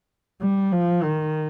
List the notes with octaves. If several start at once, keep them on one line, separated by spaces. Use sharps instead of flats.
G3
F3
D#3